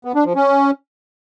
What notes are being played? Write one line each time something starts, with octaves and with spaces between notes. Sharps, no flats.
B3
D4
F3
C#4